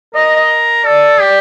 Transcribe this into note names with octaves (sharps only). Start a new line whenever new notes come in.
A#4 D#5
A4 D5
G4